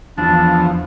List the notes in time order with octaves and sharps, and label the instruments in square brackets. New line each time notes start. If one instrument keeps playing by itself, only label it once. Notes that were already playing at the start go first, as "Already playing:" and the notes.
[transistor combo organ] E2 F3 [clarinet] D4